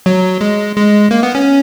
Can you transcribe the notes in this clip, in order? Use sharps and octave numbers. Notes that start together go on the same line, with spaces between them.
F#3
G#3
G#3
A#3
B3
C#4